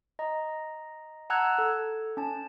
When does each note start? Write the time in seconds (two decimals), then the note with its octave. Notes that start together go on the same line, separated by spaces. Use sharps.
0.19 D#5 A#5
1.30 F#5 A5 A#5 E6 F#6 G#6
1.58 A4
2.17 C#4 A5